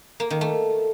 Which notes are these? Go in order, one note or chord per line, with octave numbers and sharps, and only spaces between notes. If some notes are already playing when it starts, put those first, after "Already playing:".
A#3
D#3
A3